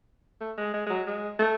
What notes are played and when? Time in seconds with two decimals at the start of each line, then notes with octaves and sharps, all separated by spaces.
0.41 A3
0.58 G#3
0.74 G#3
0.87 G#3
0.90 F#3
1.06 G#3
1.39 A3